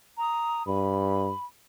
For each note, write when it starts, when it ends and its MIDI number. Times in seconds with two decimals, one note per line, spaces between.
0.18 0.63 82
0.18 0.63 87
0.67 1.31 43
0.67 1.44 83